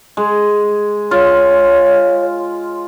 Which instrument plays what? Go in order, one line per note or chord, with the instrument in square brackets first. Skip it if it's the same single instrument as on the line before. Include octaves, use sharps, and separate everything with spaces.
[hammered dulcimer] G#3
[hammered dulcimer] F4 [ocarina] C#5